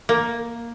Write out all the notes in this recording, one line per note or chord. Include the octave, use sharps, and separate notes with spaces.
A#3